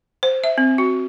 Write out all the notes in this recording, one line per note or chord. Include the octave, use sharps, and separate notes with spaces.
C5
E5
C4
F#4